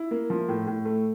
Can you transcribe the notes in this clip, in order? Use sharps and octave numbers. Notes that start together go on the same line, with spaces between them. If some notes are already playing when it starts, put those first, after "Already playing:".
Already playing: E4
A#3
F3
A2
A2
A3